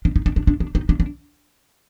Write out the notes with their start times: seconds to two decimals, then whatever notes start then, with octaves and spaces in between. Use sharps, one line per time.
0.05 D4
0.16 D#4
0.26 D4
0.36 D4
0.47 D4
0.60 D4
0.75 D#4
0.89 D4
1.00 D4